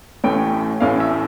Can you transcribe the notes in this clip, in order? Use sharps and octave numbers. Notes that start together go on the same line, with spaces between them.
A1 A2 E3 A3 C#4 G5
A1 A2 E3 A3 C#4 F5
E5